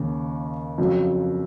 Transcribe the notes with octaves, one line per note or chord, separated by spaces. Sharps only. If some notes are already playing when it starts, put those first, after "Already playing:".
Already playing: D#2 C#3
F2 C#3 F#3